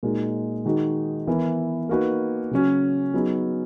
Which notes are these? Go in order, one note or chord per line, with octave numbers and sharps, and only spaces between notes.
A#2 G#3 D#4 F#4 A#4
D#3 G#3 D#4 F#4
E3 B3 E4 A#4
A#3 D#4 F#4 B4
C#3 F#3 C#4 F#4
F#3 B3 D#4 G#4